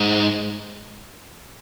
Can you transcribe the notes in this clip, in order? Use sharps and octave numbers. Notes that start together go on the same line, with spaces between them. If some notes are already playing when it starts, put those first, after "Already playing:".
Already playing: G#2